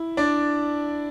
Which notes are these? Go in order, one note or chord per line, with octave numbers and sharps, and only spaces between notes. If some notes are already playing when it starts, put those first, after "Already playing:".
Already playing: E4
D4 D5